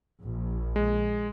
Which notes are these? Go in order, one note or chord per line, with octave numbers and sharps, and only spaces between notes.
A#1
G#3